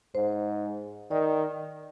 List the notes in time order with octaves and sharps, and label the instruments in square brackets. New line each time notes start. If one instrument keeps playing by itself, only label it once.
[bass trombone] G#2 [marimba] C5
[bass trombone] D#3 [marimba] D5